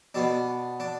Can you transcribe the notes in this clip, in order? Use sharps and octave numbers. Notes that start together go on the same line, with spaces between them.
B2 B3 D4
D4